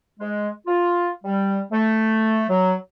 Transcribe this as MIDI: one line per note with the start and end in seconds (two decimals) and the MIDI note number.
0.19 0.48 56
0.67 1.10 65
1.24 1.60 55
1.72 2.44 57
2.49 2.74 54